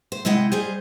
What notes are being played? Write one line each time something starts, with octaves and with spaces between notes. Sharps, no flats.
C5
C3 G#3 E4 D#5 F#5 G5
G3 G#4 C5 D#5